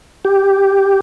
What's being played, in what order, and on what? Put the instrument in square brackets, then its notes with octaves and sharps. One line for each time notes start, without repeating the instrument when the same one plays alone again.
[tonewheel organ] G4